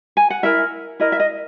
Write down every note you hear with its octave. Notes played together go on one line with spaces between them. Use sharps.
G#5
F#5
E4 A#4 E5
E4 A#4 D#5
E5
D#5